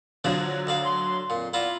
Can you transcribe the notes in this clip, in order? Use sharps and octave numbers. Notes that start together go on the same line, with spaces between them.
D3 F3 F#3 D4 G#4
D2 D4 F5
C6
F2 A#2
B3 E4 F4 D5 A#5